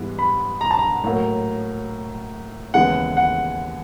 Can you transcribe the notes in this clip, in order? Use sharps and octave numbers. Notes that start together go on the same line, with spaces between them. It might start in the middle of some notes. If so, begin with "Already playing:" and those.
Already playing: G#2 E3 G3 B3
B5
A#5
A5
A#5
A2 F#3 A#3
D#2 C#3 E3 G#3 B3 F#5
F#5